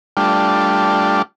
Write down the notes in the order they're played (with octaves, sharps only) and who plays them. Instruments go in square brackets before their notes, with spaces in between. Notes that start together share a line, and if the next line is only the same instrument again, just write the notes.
[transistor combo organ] G3 A3 D4 F4